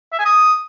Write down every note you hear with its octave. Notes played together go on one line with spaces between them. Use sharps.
E5
G#5
D#6